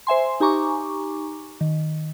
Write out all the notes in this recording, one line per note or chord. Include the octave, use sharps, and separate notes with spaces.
C5 E5 G#5 C6
D#4 G4 G#5 A#5 C#6 D6
D#3